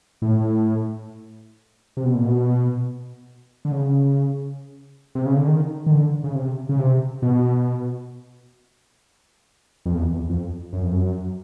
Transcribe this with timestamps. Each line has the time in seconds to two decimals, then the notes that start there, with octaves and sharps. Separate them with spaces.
0.22 A2
1.97 C3
2.05 B2
2.15 A#2
2.24 B2
3.65 D3
3.72 C#3
5.15 C3
5.26 C#3
5.37 D3
5.47 D#3
5.86 D#3
5.91 D3
6.24 C#3
6.35 C3
6.69 C#3
6.79 C3
7.22 B2
9.86 F2
9.95 E2
10.13 E2
10.30 F2
10.73 F#2
10.82 F2
10.92 F#2